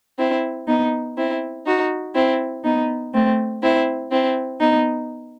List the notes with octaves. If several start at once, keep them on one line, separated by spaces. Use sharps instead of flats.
C4 E4
B3 D#4
C4 E4
D#4 F#4
C4 E4
B3 D#4
A3 C4
C4 E4
C4 E4
B3 D#4